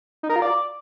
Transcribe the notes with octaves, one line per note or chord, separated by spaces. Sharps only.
D#4
A#4
F4
D5